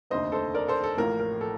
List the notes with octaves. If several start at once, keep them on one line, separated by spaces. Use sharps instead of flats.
F1 D#2 D3 A3 C4 C5 D#5
A4 C5
A#4 D5
A4 C5
A4
A1 A2 F3 A#3 A#4
A#4
A4